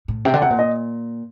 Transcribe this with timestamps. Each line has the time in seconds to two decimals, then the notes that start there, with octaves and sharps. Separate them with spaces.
0.08 A2
0.25 C3 G5
0.34 D3
0.42 C3 F#5
0.50 A#2
0.59 D#5